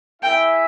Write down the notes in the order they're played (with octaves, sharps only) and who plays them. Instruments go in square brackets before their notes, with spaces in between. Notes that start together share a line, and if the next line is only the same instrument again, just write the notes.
[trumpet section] E4 G#4 E5 [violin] G5